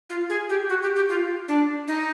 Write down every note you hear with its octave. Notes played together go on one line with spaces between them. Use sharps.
F4
G#4
G4
F#4
G4
G4
F4
D4
D#4